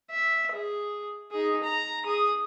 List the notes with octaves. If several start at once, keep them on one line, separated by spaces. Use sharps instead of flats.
E5
G#4
D#4 G#4
A#5
G#4 D#6